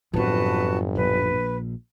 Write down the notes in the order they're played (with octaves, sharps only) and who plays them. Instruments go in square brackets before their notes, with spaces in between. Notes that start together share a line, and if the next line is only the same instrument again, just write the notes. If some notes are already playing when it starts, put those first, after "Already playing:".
[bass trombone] G1 [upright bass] F#2 A2 [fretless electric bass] F3 C4 [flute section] F#4 B4 A5
[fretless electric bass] A#1 [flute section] B4